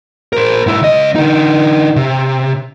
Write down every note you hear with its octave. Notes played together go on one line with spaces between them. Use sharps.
A#4 C5
G#2 E4
C#2 D#5
D3 D#4
C3